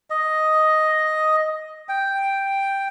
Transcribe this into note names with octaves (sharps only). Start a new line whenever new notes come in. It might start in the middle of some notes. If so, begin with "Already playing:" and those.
D#5
G5